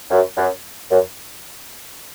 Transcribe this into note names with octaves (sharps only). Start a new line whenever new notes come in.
F#2
F#2
F#2